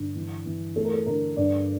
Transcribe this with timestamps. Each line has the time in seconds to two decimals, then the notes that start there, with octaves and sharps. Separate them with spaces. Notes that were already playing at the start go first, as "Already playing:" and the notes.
Already playing: G2 D3
0.15 E3
0.46 E3
0.76 A3 A4
0.85 A#4
0.93 A4
1.06 D3 A#4
1.37 G2 D5